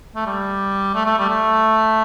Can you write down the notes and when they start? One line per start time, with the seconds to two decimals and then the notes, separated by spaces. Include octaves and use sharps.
0.15 A3
0.26 G3
0.95 A3
1.06 A3
1.18 G3
1.29 A3